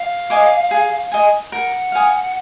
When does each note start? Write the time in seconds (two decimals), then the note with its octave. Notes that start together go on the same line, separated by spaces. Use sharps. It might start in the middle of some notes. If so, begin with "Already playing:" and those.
Already playing: F5
0.30 D#5 G#5 D6
0.71 G#4
1.12 D#5 G#5
1.51 A#4 F#5
1.92 F5 G#5 D#6